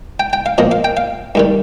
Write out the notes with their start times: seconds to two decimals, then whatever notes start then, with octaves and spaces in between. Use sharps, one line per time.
0.20 G5
0.33 G5
0.46 F5
0.58 A#2 F3 D#5
0.71 F5
0.84 G5
0.97 F5
1.35 G2 D#3 G3